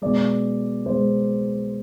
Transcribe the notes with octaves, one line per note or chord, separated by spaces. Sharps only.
B2 G#3 D5
B2 G#3 C5